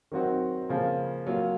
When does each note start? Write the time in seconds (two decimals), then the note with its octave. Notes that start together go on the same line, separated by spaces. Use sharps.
0.12 D#3 F#3 C4 D#4 F#4
0.69 C#3 F3 A#3
1.27 F#3 A#3 F4